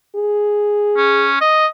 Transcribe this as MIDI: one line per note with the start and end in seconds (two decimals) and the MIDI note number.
0.16 1.29 68
0.97 1.36 61
1.41 1.67 75